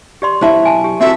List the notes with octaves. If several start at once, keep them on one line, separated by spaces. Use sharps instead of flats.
G4 D5 C6
B1 E4 G4 C5 E5 A5
G#5 A5
G4
C4 E4 F#4 A4 E5